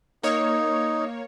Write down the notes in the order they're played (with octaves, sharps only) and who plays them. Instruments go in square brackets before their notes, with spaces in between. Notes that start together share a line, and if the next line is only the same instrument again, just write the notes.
[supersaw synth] A#3 C#5 [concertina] D#4